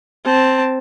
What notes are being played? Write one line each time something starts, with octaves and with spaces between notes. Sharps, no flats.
C4 A5